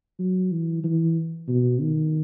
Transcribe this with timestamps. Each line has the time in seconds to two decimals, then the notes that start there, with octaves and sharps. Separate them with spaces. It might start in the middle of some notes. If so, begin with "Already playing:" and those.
0.19 F#3
0.51 E3
0.84 E3
1.48 B2
1.81 D#3